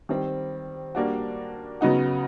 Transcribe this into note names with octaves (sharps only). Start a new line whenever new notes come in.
D#3 G3 C4
G3 A#3 D4 F#4
C#3 F#3 B3 D#4 F#4